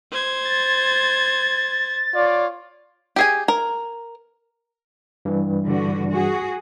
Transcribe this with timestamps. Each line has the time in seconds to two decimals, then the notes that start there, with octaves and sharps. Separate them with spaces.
0.12 C5 G#6
0.45 A6
2.15 F4 C#5 D5
3.16 G4 G#4 G#5
3.48 A#4
5.25 G2 E3 G3
5.67 D3 F#4
6.11 F#4 G#4